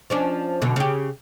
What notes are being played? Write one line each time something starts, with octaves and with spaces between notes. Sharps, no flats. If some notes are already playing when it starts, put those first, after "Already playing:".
F3 C#4 D4
F#2 B2 D3
C#3 G4